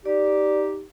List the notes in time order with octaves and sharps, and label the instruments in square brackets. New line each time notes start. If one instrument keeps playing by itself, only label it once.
[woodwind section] D#4 G4 [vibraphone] D5